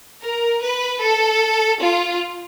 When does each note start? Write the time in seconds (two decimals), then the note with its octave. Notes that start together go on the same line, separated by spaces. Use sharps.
0.21 A#4
0.60 B4
1.00 A4
1.78 F4